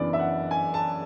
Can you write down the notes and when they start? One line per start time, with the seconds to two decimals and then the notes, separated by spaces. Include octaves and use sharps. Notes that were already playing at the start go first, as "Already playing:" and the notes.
Already playing: F#1 F#2 E3 B3 D4 D5
0.13 E5
0.19 F#5
0.51 G#5
0.74 A5